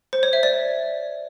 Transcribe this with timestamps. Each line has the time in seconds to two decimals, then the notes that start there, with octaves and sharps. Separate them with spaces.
0.13 C5
0.23 C#5
0.33 E5
0.43 D5